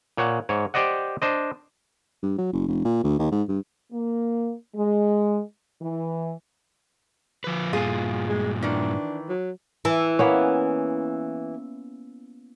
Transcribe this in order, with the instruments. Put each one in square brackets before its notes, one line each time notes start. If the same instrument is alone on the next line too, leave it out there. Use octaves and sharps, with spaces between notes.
[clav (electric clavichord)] A#2 C#5 F#5
G#2 C#5
G4 C5 D5 D#5 F#5
D4 C5 D#5
[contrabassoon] G2
F#3
F#1
F1
A#2
D2
D#2
G#2
G2
[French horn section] A#3
G#3
E3
[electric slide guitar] F3 B4
[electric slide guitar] G2 A#2 [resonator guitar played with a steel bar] F4 G#4
[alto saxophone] G#3
[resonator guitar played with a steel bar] D#3 E3 [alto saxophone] D4
[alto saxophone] F#3
[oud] E3
[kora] A#3 B3 C#4